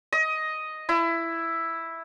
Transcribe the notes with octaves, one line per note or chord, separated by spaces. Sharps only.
D#5
E4